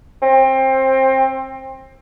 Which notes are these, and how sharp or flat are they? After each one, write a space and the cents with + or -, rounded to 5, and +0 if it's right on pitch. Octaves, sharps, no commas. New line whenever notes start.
C4 +25